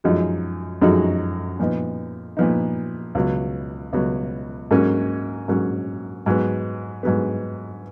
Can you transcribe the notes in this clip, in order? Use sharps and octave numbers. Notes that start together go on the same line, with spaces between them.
F#2 F3 G#3 D#4 F#4
F#2 F3 G#3 D#4 F#4
A#2 F3 B3 D#4
A#2 F3 B3 D#4
C#2 B2 F#3
C#2 B2 F#3
G#2 F#3 A#3 C#4
G#2 F#3 A#3 C#4
G#2 F#3 B3
G#2 F#3 B3